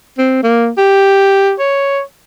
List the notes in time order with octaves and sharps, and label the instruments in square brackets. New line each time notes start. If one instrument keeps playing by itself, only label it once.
[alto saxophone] C4
A#3
G4
C#5